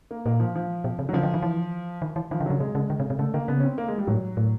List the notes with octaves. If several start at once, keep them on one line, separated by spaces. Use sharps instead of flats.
A#3
A#2 A#3
F3
F3
B2
C3
F#3
C#3 F3
D3
D#3
E3
D#3
E3
D#3 F3
D3
C#3 F#3
C3 G#3
C#3
D3
C3
C3
C#3 A3
D3 A#3
C#3 B3
C#4
C4
A#3
G#3
G3
A2 F#3
A2